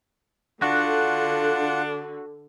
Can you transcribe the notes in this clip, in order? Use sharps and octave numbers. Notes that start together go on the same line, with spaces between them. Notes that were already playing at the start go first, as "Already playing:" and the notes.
D3 D4 F4 F#4 F#5